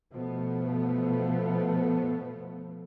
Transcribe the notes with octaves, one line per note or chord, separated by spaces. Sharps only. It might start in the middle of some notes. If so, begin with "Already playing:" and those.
B2 F3 A3 B3